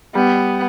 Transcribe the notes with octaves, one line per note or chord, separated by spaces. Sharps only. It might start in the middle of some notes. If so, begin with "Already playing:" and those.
G3 B3